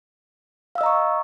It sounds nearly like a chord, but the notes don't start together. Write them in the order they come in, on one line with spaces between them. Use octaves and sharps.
F5 E6 D#5 A#5 C#6